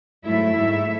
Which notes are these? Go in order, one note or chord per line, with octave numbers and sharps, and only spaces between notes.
G#2 F#3 A3 E4 E5
G#2 F#3 A3 E4